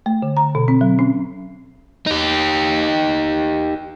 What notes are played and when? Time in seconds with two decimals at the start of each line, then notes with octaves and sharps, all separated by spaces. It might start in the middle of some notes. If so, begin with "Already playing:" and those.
0.06 A3
0.22 D3
0.37 A#5
0.55 B2
0.68 C4
0.81 F#3
0.99 C#4
2.07 D#4 G4